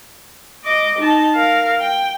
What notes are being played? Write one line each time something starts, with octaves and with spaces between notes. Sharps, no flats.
D#5 D6
D#4 A5
A#4 F5
G5